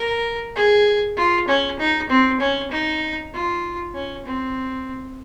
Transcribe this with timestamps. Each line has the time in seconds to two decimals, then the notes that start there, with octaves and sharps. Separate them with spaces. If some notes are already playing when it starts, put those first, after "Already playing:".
Already playing: A#4
0.55 G#4
1.17 F4
1.48 C#4
1.79 D#4
2.09 C4
2.40 C#4
2.71 D#4
3.33 F4
3.94 C#4
4.26 C4